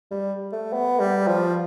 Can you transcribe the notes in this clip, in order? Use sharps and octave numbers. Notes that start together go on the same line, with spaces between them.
G3
A3
B3
G3
F3